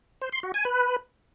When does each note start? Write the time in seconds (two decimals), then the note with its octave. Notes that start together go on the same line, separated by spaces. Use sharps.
0.22 C5
0.32 C6
0.43 F#4
0.54 G#5
0.65 B4